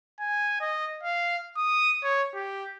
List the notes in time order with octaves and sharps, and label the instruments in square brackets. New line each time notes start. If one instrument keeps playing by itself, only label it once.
[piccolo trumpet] G#5
D#5
F5
D#6
C#5
G4